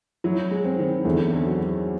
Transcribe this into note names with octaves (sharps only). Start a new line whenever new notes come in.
F#3 E4
G#3
C4
D#3
E2 D3
D3
F#3